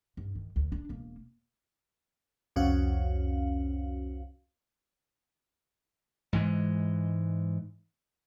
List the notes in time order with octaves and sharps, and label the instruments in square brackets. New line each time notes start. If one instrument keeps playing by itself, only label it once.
[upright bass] G2
D#3
D2
D4
E1 A#3
[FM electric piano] C2 F2 C#4 F#4 F5
[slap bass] G#2 E3 G#3